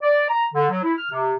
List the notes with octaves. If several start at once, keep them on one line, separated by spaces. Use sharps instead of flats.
D5
A#5
D3
F#3
E4
F6
C3